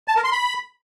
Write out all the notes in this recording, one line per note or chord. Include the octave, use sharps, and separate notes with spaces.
A5
A#4
C6
B5